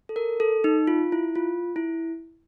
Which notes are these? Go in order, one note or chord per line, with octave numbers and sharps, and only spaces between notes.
A4
A#4
A4
D#4
F4
E4
F4
E4